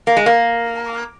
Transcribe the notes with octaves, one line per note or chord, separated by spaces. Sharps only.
A#3
G#3
A#3